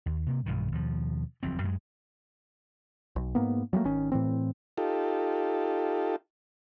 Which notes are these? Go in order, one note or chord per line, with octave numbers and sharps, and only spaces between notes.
D#2
C3 A#3
B1 G2 D#3
D#2 B2 F3
F#1 E2 F3 C4
F#2 G#3
B1
G#2 A#3 B3
F#3 G3 A3 A#3
G#1 D#3 C#4
A2 E3 C4
D#4 F4 G4 A4